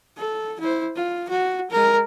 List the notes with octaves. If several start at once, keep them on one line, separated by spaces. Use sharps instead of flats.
A4
E4 C5
F4
F#4
G#3 A#4